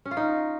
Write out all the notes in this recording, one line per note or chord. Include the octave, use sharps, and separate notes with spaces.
C#4
F4
D#4